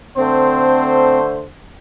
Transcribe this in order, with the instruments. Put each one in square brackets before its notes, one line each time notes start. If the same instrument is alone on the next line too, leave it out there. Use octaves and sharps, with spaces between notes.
[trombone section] D3 A3 C5 [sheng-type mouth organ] C4